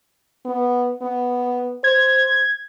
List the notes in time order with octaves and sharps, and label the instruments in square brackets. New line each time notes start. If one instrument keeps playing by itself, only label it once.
[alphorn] B3
B3
[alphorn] C5 [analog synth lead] G#6